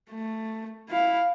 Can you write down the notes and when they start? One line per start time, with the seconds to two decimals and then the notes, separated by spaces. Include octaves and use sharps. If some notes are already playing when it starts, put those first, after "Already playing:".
0.10 A3
0.90 E4 F5